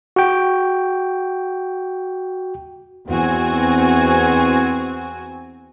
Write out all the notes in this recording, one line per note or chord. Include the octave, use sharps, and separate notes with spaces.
F#4 G5
E2 C4 F#4 G#5